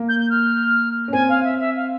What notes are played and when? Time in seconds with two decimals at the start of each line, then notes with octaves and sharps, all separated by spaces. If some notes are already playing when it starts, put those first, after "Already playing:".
Already playing: A#3
0.09 G6
0.19 G6
0.30 F6
1.08 C#4
1.12 C4 G#5
1.29 F5
1.44 E5
1.59 E5
1.76 F5